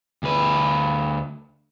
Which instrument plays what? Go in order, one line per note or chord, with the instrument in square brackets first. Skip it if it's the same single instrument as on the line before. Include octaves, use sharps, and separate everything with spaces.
[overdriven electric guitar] D2 B4